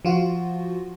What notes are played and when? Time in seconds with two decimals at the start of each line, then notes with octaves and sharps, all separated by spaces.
0.05 F3 F4 F#4